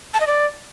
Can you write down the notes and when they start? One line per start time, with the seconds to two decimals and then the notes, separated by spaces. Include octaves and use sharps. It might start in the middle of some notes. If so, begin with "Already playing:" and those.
0.14 A5
0.20 D#5
0.27 D5